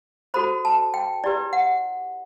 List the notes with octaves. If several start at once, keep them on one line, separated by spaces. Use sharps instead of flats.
F#4 A4 C5 B5
A5
G5
E4 G4 B4 D5
F#5